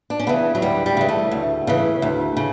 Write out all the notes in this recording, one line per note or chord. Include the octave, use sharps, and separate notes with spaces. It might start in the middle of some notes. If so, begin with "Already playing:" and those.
D4
C#4
C#3 E3 B3
F#3
D2 G3
G3
C#3 E3
A3
D2
C#3 E3
D2
C#3